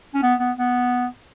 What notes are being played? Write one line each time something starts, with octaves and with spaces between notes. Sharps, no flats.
C#4
B3
B3
B3